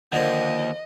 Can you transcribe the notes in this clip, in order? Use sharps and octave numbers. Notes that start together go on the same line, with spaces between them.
D#2 D3 F3 A#3 D#5